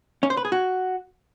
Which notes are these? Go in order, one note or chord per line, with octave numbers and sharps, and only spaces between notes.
C#4
C5
B4
G#4
F#4